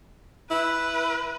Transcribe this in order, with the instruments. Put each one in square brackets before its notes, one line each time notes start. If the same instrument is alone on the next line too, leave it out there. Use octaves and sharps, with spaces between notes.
[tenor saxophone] E4 [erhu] B4